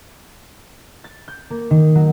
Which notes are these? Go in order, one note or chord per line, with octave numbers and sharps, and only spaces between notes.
A6
G6
A#3
D#3
F#3